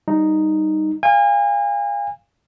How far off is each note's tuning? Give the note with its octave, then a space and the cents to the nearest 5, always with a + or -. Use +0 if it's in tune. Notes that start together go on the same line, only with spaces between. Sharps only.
G3 +0 D#4 -5
F5 +0 G#5 -35